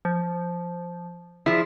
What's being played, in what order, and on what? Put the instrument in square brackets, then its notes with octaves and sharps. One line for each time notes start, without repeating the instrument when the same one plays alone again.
[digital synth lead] F3
[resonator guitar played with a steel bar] F3 E4 [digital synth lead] G#4